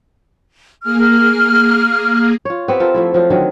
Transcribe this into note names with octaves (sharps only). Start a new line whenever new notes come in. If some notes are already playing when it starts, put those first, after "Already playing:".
A#3 G#4 F6
F4 C#5
B3 C4 G4
F4 A4 A#4 C5
F3 A3 E4
F3 F#3 F4
D3 D#3 F#3